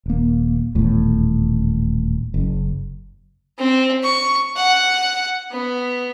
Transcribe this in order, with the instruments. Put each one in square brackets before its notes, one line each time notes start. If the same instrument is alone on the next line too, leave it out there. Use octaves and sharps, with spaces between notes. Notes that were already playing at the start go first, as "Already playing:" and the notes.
[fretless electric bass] D#1 A#3
D#1 E2 A2
F#1
[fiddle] C4
C#6
F#5
B3